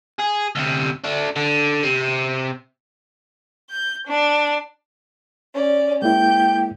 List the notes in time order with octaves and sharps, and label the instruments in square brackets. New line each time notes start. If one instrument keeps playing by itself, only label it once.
[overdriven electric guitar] G#4
D2 C3
A3 D4
D3
C3
[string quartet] G6
D4
C#4 D5
[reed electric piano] G#3 A#3 E4 [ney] G5 [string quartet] G6